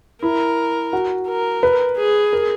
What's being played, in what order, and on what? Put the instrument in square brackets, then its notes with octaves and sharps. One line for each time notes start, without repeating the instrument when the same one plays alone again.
[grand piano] E4 [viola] A#4
[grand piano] F#4
[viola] A#4
[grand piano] B4
[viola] G#4
[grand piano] A#4